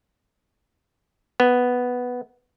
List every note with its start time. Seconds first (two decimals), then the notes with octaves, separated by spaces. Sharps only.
1.40 B3